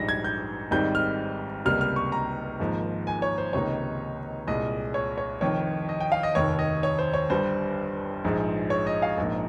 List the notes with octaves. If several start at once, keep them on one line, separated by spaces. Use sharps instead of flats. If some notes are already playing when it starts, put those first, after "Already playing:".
Already playing: A#1 G#2 G3 A#6
G#6
G6
G#1 G#2 D#3 G3 C4 G6
F6
C#2 C3 G3 A#3 F6
F6
C#6
A#5
G#1 G#2 F3 A#3
G#5
C#5
C5
C#2 C3 D#3 A#3 D#4 C#5
C2 A#2 G#3 D#5
C#5
C#5
F1 F2 D#3 C#5
D#5
G5
F5
D#5
F1 D#2 D#3 C#5
D#5
C#5
C5
C#5
G1 G2 G3 C5
A#1 G#2 F3 G#3
C#5
D#5
F5
A#1 G#2 F3 A#3